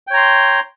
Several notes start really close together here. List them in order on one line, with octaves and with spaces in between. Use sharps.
G5 C#5 A#5 C6